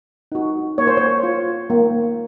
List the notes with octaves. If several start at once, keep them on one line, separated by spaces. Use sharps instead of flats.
D#4 F#4
A#3 C#5
C5
C#5
F4
A#3